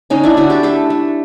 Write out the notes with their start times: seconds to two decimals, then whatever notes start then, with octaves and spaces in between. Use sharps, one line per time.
0.10 D3 C#4 D#4
0.24 D4 E4
0.37 D3 E4 F#4
0.50 G4 A4
0.63 A3 G4 A4
0.90 A3